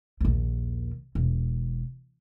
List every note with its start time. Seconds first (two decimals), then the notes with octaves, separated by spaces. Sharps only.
0.21 A#1 D#2
1.15 E1